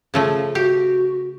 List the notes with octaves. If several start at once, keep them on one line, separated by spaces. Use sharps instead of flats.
C#3 F3 A3
F#4 G4